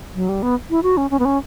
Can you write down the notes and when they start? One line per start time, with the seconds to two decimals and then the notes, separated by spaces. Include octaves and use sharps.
0.15 F#3
0.29 G3
0.42 B3
0.70 E4
0.83 F#4
0.97 C#4
1.11 C#4
1.19 B3
1.25 C#4